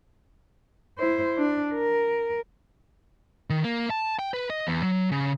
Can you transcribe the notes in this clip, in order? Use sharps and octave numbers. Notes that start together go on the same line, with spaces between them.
E4 C5
D4
A#4
D#3
A#3
A5
G5
B4
D#5
E2
F#3
C#3